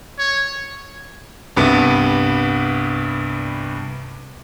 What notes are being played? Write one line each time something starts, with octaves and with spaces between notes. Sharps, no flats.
C#5
C2 G2 B3